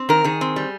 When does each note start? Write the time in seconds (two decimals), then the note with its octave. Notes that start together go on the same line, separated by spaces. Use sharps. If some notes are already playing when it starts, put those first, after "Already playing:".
Already playing: C4
0.09 D#3 A#4
0.24 D#3 G#4
0.41 C4
0.56 G3